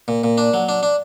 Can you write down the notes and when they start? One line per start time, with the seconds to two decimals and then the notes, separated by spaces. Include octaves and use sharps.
0.08 A#2
0.24 A#2
0.38 D4
0.54 F#3
0.69 D4
0.83 D4